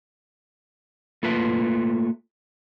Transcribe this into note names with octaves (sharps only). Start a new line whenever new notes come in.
A3 A#3 F4 B4 E5 A5